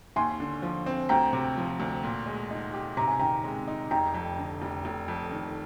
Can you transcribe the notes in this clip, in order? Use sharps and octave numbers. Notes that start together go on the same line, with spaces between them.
D#2 G#5 C6
D3
F3
C4
D2 G5 A#5
C3
F3
D2
A#2
G#3
D#4
G4
C3 A#5
G#5
D#3 G5 A#5
G#3
D#4
F1 G5 A#5
F2
D3
F1
F1
F2
D#3